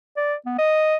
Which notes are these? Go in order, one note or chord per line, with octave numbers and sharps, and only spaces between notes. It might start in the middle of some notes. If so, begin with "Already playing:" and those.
D5
B3
D#5